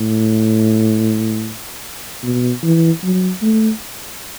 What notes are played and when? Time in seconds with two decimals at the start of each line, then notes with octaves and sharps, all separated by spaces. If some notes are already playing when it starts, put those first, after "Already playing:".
Already playing: A2
2.23 B2
2.63 E3
3.03 F#3
3.42 A3